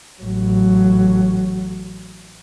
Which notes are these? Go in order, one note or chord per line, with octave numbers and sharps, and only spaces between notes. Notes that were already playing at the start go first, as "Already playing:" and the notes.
A1 F#3